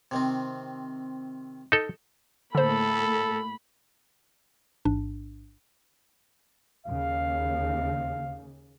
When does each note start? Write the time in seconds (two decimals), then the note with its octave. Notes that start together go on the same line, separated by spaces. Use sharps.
0.11 C3 D#3 C4
1.72 D#4 A4
2.55 A2 D3 A3 A#3 A4 C5 B5
4.85 A1 G#2 D4
6.86 D#2 C#3 F5